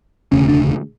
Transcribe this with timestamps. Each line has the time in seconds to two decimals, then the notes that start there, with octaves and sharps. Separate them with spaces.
0.32 E1 D2 C#3 C#4
0.48 D4